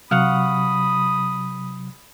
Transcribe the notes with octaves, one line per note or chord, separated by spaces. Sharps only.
C3 F#3 F5 F#5 B5 C#6 D#6